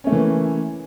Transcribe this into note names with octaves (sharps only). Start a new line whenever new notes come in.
E3 A3 A#3 C#4